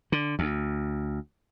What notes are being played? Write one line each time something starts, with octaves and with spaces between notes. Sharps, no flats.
D3
D2